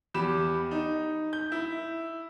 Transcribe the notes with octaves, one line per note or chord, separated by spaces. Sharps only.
E2 G4 B5 E7
D#4
G6
E4